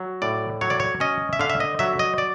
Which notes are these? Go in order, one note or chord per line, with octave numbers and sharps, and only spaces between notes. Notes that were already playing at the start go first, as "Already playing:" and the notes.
Already playing: F#3
A2 D5
F#3 C#5
D5
C#5
C#4 D#5
E5
D3 F5
E5
D#5
F#3 E5
D#5
D5